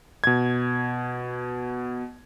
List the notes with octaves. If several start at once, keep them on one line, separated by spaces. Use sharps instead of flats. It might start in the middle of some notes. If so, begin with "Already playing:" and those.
B2 G#6